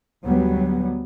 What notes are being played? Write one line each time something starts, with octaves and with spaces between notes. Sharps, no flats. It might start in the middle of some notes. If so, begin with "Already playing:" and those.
D2 F#3 G3 B3